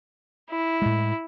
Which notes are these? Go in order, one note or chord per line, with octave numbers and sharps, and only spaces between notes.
E4
A2 G#3